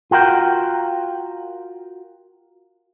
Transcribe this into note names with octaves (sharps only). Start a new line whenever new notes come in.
F4 F#4 A#4 G5